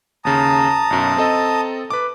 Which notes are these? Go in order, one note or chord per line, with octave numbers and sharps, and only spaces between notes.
D#2 C#3 A5 A#5 D#6
B1 F#2
C4 A4 D#5
B4 D6